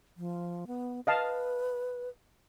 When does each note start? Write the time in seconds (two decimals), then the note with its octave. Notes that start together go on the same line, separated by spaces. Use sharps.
0.17 F3
0.67 B3
1.07 B4 D#5 F5 A5